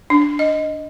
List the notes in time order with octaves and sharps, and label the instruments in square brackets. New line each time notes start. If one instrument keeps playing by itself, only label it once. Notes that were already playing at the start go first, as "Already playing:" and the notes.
[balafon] D4
D#5